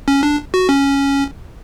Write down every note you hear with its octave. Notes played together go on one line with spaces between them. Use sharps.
C#4
D4
F#4
C#4